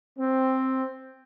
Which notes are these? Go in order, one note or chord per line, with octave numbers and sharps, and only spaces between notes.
C4